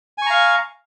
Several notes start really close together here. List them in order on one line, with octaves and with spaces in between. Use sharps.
G#5 C#6 A#5 F5